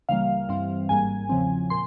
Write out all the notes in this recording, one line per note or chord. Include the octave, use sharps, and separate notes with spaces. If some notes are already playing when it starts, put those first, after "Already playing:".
C#2 C#3 E3 G3 A#3 F5
G2 E3 G3 C4
G#1 G#2 G3 A#3 G#5
E2 C#3 F3 C4
A#2 C6